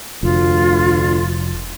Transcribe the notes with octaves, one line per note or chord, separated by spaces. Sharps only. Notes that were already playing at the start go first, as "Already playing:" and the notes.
F1 D2 F4